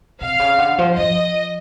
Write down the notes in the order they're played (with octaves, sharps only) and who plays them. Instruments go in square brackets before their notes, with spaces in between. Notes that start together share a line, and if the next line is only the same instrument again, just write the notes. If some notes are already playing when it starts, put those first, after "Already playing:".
[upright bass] C3 [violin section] F5
[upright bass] C#3
D3
F3
[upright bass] F3 [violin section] D#5